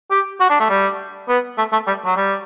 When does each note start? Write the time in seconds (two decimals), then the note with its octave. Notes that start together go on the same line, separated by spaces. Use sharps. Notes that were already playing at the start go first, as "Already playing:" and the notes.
0.11 G4
0.40 F#4
0.50 D4
0.60 A3
0.70 G3
1.29 B3
1.58 A3
1.72 A3
1.87 G3
2.05 F#3
2.17 G3